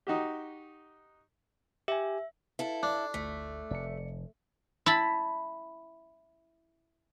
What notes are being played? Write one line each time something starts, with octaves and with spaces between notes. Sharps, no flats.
D#4 F#4 G4
G4 E5 G#5
E4 A4 B4 E5 F5
D4
G1 D2 A3 B6
F1 D5 C#7
E4 A5 B5